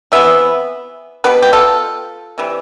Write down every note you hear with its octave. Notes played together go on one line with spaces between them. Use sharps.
C3 E3 B3 E5
B2 B3 G4 B4
G4
F4 A4
C3 E3 G3